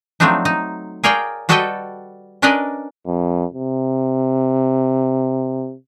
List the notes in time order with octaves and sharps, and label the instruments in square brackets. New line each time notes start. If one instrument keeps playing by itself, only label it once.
[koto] F3 F#3 A3 C4 D4 D#4
D#4
G#4 A#4 C#5 D5 F5 G5
G3 F#4 A4 B4 D#5 G5
C#4 D4 A#4 B4 D5 D#5
[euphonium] F2
C3